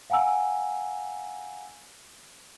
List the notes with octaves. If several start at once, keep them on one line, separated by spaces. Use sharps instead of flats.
F5 F#5 G#5 A#5 E6